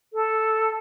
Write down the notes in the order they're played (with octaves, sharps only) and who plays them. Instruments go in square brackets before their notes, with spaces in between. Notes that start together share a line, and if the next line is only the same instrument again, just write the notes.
[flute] A4